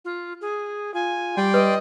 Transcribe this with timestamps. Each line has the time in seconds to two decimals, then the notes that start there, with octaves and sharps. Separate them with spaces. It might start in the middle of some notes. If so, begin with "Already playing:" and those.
0.05 F4
0.41 G#4
0.94 F4 G#5
1.37 G3 D5 G5 C6
1.54 B4 D#5